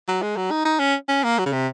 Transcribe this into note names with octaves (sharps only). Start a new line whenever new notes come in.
F#3
G#3
F#3
D#4
D#4
C#4
C#4
A#3
F#3
C#3
C3